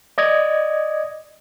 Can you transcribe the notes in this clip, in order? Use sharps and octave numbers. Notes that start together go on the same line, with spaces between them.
D5 D#5 G#6